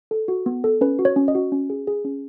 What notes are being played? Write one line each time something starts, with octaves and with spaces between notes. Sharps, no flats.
A4
F#4
B3
A4
C#4 B4
F#4
C#5
C#4
D#5
F#4
C#4
G#4
G#4
C#4